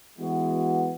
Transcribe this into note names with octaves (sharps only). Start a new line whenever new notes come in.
E3 G#3 B3 F#4